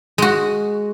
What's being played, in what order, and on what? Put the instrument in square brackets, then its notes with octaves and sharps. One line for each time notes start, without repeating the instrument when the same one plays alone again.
[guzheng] G#3 F#4